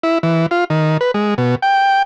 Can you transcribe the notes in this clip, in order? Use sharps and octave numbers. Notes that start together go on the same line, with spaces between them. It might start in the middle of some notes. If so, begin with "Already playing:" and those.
E4
E3
F4
D#3
B4
G#3
B2
G5